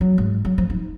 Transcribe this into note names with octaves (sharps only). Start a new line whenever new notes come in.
F#3
G#2
F#3
F3
D#4